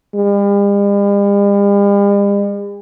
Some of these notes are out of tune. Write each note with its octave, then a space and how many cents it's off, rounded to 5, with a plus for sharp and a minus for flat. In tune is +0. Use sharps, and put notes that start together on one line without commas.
G3 +45